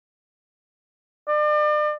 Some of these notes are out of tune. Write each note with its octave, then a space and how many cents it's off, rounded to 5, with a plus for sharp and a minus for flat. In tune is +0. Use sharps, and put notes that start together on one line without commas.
D5 +40